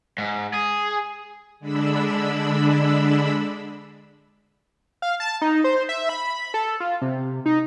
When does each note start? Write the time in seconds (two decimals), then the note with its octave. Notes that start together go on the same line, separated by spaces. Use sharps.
0.18 G#2
0.53 G#4
1.60 D3 G#3 D4 B5 E6
5.02 F5
5.20 A5
5.42 D#4
5.64 C5
5.89 E5
6.09 B5
6.54 A4
6.80 F4
7.02 C3
7.46 D#4